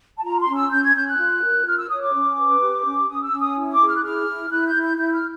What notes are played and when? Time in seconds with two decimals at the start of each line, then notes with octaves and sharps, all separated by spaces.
0.17 A5
0.23 F4 A#5
0.40 C6
0.48 C#4
0.55 E6
0.71 C#4 G6
0.83 G#6
0.95 C#4 G6
1.06 F#6
1.18 F4
1.42 A#4
1.66 F4 F6
1.78 E6
1.90 C#5 D#6
2.01 D6
2.13 C#4
2.38 B4
2.61 G4
2.84 C#4
3.09 C#4 D#6
3.23 E6
3.32 C#4
3.40 D#6
3.56 E4
3.72 D6
3.80 G#4
3.88 F6
3.96 F#6
4.03 E4 F6
4.26 E4
4.50 E4 F#6
4.67 G6
4.74 E4
4.82 G6
4.97 E4 G6
5.14 F6